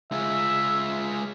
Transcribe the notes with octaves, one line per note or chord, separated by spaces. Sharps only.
G#3 F4 E5